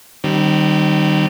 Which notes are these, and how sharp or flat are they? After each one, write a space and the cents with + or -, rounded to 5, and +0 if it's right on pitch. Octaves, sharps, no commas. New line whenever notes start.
D#3 -35 G3 -30 C4 +15